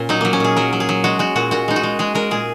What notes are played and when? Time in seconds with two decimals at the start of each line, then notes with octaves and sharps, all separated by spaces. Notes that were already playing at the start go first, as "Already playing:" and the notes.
Already playing: A#2 C#4
0.09 F#3 D#4
0.21 F#3 A#3
0.33 C#4
0.40 A#2 G#4
0.56 F#3 A#4
0.73 F#3
0.80 G#4
0.89 F#3
1.04 G#3 F#4
1.19 G#3 F#4
1.36 A#2 F#4
1.51 A#2 F#4
1.68 G#3 D#4
1.76 F#4
1.83 G#3
1.99 G#3 G#4
2.15 G#3 A#4
2.31 A#2 G#4